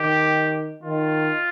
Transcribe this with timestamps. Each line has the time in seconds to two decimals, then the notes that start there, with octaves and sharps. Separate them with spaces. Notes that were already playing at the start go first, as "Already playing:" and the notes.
Already playing: D#3 G4
0.83 D#3 F4